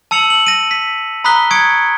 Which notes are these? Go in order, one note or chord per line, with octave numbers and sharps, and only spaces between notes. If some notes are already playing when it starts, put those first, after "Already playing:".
A5 E6 C#7 F7 F#7
F#7
A#6 D#7
B6
A#5 B5 D#6 F#6 B6 G7
C#6 D#6 G#6 C#7 D7